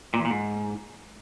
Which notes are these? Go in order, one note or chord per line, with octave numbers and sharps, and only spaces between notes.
A#2
E2
A#2
G#2